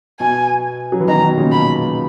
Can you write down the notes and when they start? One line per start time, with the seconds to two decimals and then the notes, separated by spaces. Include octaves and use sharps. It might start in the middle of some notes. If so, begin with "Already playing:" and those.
0.20 B2 G#5
0.92 F#3
1.00 E3
1.08 B2 D#3 A#5
1.22 B2
1.37 A#2 C#3
1.51 B2 B5